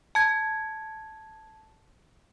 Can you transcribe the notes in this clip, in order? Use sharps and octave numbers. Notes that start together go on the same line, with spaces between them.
A5 G#6